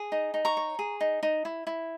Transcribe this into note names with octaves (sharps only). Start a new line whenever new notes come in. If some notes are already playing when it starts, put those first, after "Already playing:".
Already playing: G#4
D#4
D#4
A#5 C#6
C#5
G#4
D#4
D#4
E4
E4